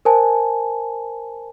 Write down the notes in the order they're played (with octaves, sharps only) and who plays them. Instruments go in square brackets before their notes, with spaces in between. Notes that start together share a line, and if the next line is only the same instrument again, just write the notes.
[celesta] A#4 C5 G#5 A5